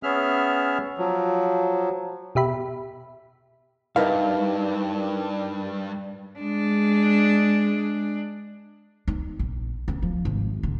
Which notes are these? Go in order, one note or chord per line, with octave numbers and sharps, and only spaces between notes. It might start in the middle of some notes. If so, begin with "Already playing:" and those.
B3 C#4 G#4 E5 F6
F3 F#3
B2 G4 E5 B5
G2 D#4 E4 A#4 B4 F5 A5
G#3 D4
D#4
A#1
C#4
F3
G#1
D3